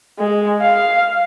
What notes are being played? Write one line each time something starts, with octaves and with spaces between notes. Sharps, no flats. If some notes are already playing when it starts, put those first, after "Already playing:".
G#3
F5